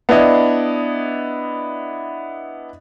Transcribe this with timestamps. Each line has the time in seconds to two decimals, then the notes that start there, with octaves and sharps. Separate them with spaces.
0.09 B3 D4 E4 D5 D#5